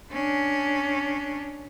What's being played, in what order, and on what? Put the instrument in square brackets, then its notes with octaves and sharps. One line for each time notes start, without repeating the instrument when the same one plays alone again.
[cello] C#4 D4